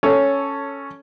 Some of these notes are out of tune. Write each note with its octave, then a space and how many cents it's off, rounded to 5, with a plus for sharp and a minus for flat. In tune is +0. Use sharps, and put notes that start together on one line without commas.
C#4 +0 A4 +5 C#5 +5